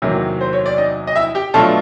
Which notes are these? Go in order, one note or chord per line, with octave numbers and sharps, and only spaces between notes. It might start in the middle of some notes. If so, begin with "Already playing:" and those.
E2 C3 D#3 F#3 A#3
C5
C#5
D5
D#4 D#5
D#5
E4 E5
G4 G5
B2 F#3 A3 D4 F4 A4 A5